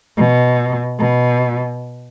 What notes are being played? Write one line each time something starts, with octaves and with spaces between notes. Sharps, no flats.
B2
B2